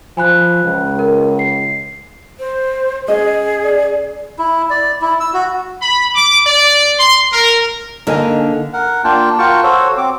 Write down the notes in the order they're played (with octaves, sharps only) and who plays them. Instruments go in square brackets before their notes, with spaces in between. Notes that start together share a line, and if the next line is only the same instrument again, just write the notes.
[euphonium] F3 [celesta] G#5 B5 F#6
[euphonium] C#2
[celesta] A#4
C7
[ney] C5
[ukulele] C#4 D#5 [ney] G#4
[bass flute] D5
[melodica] E4
D5
E4
E6
F#4
[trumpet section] B5
D6
D5
C6
A#4
[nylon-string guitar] D3 A#3 D#4 [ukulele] A#4 D#5 G#5
[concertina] A#4 F#5
A#3 D4 F4 G5 A5
F4 F#4 A#4 G5 A5 C#6
F#4 A4 C5 C#5
C4 D6